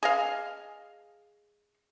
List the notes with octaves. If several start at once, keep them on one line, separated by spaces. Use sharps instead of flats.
G#4 D#5 F5